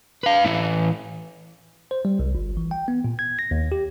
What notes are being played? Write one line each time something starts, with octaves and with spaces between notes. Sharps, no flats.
B4 F5
A2 E3
C5
G3
C2
G1
E3
G5
B3
A#2
G#6
A#6
D#2
G4